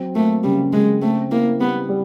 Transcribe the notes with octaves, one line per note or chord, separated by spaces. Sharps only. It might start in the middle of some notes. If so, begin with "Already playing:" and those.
Already playing: F#3 C4
A3 A#3
C#3 G3
C#3 G#3
A3 C4
A#3 E4
G3 B3
G3